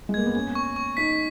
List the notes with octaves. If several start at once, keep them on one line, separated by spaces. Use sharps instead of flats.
G#3
A#3 G#6
B3
C#4 G#6
C#6
C#6
D#4 B6